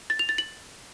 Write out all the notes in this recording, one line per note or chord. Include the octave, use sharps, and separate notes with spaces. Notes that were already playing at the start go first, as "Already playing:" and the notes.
A6
F7
A6
F#7